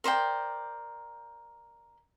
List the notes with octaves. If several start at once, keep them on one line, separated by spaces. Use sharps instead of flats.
A#4 C5 D5 G5